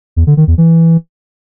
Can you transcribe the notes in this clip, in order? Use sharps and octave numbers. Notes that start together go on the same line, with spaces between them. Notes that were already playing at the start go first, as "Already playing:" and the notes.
E2
D3
D#3
E2
E3